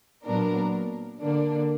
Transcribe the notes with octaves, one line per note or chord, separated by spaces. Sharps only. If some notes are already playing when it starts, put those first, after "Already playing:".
A#2 F#3 B3 D4 A#4
D3 A#3 D4